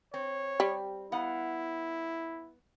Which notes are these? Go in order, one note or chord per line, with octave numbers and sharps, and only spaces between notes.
C4 C#5
G3
B3 E4 F5 F#5